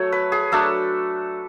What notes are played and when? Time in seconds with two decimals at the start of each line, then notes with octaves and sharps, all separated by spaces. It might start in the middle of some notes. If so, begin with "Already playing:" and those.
Already playing: F#3 A3 C#5
0.12 B4
0.32 G#4
0.52 F#3 A3 D4 A4